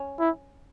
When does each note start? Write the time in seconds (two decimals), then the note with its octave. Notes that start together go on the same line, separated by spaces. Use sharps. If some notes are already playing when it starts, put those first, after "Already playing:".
Already playing: C#4
0.19 E4